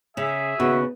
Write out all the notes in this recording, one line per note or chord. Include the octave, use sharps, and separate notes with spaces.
C#3 G#4 E5
D#2 C#3 B3 F#4